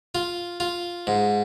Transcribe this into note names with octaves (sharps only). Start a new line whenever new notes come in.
F4
F4
G#2